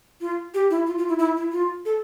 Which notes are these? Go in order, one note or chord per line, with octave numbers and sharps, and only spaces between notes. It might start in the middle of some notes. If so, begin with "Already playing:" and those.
F4
G4
E4
F4
F4
E4
E4
E4
F4
A4